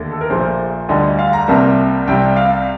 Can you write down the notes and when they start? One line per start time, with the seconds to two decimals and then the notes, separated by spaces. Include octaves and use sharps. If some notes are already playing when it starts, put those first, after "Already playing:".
Already playing: D#2 D3 A3
0.11 A4
0.21 A#4
0.30 A#1 A#2 A3 C5
0.89 D2 D3 G3 D#5
1.19 F5
1.33 A#5
1.47 C2 C3 G3 A#3 A5
2.07 C2 C3 G3 G5
2.36 F5